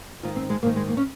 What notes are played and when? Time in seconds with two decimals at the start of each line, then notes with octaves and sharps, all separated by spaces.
0.23 G#2 D#3 F4
0.36 C4
0.50 G#3
0.62 G#2 A#3
0.66 D#3
0.76 G#3
0.88 A#3
0.97 C#4